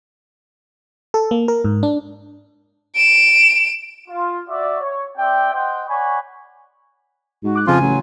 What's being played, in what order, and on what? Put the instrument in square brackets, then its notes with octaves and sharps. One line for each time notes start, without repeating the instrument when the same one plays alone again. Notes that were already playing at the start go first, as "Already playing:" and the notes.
[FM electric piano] A4
A#3
A#4
G#2
D4
[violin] D7 E7
[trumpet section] F4
F#4 D5 E5
C#5
C4 G4 D5 E5 G5
C5 D#5 F#5 G5
C#5 D5 F#5 G#5 B5 C#6
[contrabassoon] G#2 [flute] F#4
[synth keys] D6 F#6
[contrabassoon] F2 [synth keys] C#3 C6 [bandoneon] F3 F4 [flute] G#5
[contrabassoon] A1 [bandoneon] F#3